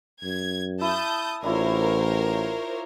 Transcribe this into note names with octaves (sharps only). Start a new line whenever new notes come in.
F#2 G#6
E4 A5 D#6 G6
A1 D4 E4 F4 A#4 C5 C#5